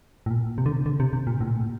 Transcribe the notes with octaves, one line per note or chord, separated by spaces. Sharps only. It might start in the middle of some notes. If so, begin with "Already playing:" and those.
A2
A#2
C3
D3
C3
D3
C3
C3
A#2
A2
A#2
A2